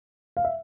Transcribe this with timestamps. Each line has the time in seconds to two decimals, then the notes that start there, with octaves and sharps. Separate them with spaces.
0.37 F5
0.45 E5